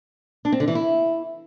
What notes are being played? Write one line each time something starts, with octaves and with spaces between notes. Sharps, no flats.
D4
C4
D3
E3
E4